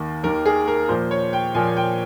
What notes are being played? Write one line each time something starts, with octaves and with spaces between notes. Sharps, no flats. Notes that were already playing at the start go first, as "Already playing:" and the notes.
Already playing: D#2 D#3 A#3
D#2 D#3 A#3 A#4
G#4
A#4
A#2 F3 A#3 C5
C#5
G5
A#2 F3 A#3 G#5
G5